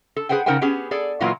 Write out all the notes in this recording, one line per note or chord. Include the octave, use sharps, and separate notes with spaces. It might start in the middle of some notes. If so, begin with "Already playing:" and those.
A4
G#4 B4 C5 F#5 G5
C#3 D#4 A#4 C5 F#5 G5
B3 C#4 G4 G#4
G#4 A4 D5
A#2 E3 F#3 A#3 B3 F4